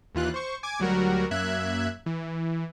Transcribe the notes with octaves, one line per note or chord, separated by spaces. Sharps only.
D#2 E3 F4 F#6
C5 C#6
G#5 D6 G#6
D2 F#3 G3 F#4 A#4
F#2 A#3 E5 F#6 G#6
E3